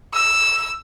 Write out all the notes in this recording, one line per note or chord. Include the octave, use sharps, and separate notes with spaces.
E6